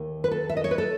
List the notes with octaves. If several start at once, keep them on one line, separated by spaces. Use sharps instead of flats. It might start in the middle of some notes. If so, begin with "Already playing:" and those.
Already playing: D#2 D#3 A3
B4
A4
E5
D#5
C#5
B4
A4